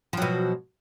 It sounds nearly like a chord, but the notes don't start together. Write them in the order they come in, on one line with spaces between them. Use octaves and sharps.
F3 F#3 B2